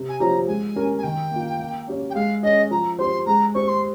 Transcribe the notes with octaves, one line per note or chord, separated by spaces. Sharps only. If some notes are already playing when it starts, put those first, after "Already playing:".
Already playing: C3
G#5
F3 C4 G4 C#5 A#5
G#3 G#5
C#4 G4 A#4 C#5
G#5
D#3 G5
A#3 F4
A#3
C#4 G4 C#5
G5
G#3 F5
C#4 G#4 D#5
F3 A#5
C4 G4 C5 C6
G#3 A#5
C4 G4 C5 C#6
C6